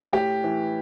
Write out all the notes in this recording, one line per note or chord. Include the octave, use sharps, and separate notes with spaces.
A2 G4
E3